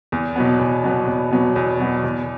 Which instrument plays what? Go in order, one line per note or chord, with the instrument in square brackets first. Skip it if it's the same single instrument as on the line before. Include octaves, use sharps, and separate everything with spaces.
[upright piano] E2
B2 F#3 B3
E2
B2 F#3 B3
E2
B2 F#3 B3
E2
B2 F#3 B3
E2